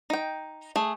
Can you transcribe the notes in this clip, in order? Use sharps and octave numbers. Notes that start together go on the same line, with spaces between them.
D#4 G5
A3 G#4